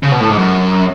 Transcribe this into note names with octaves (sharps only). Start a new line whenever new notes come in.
C#3
B2
A2
G#2
F#2